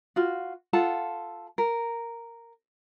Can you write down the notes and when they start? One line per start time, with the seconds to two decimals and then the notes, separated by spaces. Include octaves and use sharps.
0.16 F4 F#4
0.73 F4 A4 F#5 A5
1.58 A#4